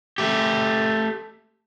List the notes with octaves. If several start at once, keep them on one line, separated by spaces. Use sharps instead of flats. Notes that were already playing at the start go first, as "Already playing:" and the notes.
A3 G4